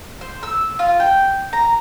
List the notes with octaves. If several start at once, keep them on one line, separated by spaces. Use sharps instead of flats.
C5
E6
F4
G5
A#5